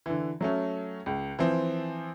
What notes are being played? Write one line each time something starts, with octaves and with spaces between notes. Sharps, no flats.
D3 E3
F#3 A3 C#4
C#2
E3 F3 C4